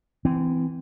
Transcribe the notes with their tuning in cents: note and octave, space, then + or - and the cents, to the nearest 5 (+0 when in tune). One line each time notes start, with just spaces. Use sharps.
E3 +0 C4 -25